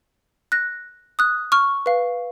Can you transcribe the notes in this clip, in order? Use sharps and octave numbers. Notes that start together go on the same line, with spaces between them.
F#6 A#6
D#6 F#6
C#6 F6
B4 F5